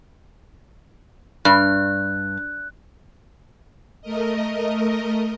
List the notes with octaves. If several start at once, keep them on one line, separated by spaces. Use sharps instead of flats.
G2 F#6
A3 A#4 D#5